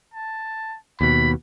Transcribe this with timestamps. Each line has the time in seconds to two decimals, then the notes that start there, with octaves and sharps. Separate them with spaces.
0.14 A5
1.01 D#2 B2 B5